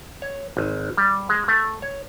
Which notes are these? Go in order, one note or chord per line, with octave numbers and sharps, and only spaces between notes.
C#5
G#1
G3
G#3
A3
C#5